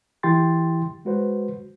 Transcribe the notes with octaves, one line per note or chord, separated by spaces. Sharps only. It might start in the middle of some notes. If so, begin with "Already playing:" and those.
E3 E4 G4 G5 C6 A6
G#3 F#4 B4 C5